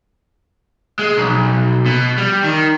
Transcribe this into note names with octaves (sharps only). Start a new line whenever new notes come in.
G#3
B1
B2
G3
D#3